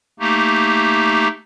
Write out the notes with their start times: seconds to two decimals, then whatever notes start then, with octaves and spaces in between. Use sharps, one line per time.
0.19 A3 A#3 D#4 G4